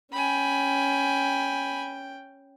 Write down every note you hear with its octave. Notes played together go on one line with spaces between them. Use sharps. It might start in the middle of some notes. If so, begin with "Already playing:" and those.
C#4 G5 G#5 B5